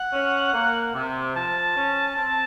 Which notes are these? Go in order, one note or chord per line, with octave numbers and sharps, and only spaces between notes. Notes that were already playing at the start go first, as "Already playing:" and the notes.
Already playing: F#5
C#4
A#3
C3
F3 A5
C#4
C4